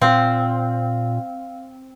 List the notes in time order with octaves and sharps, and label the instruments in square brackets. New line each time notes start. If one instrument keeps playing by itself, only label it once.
[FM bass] A#2 [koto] C4 [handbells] F5